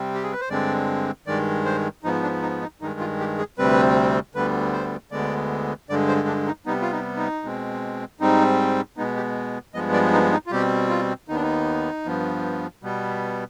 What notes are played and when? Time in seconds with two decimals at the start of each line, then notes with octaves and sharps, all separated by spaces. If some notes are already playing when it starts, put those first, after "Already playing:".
Already playing: C3 G3 C4
0.14 G4
0.23 G#4
0.32 B4
0.40 C5
0.50 G2 D3 G#3 C4 D5
1.27 G2 D#3 G#3 D5
1.65 C5
2.03 G#2 F3 B3 D#4
2.23 D4
2.42 D#4
2.61 D#4
2.81 G2 D#3 G#3 D#4
3.00 F4
3.19 G4
3.38 G#4
3.58 D2 C3 G3 C4 B4
4.35 D2 D3 G3 B3 B4
4.73 C5
5.11 D2 D3 G#3 B3 D5
5.89 G2 D3 G#3 D5
6.08 C5
6.27 D4
6.46 D#4
6.66 C3 G3 B3 D#4
6.82 F4
6.92 D#4
7.17 D#4
7.43 B2 G#3 C4
8.20 G#2 G3 C4 D#4
8.97 B2 G#3 B3 D#4
9.16 G4
9.74 G2 F3 G#3 B3 D#5
9.93 D5
10.13 D#4
10.32 D#4
10.47 F4
10.51 B2 G3 C4 G4
10.89 F4
11.28 D#2 D#3 B3 D#4
11.36 D4
11.42 D#4
12.05 G2 F3 B3
12.83 B2 G3 B3